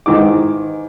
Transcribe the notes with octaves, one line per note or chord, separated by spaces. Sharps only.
G#2 D#3 E3 D6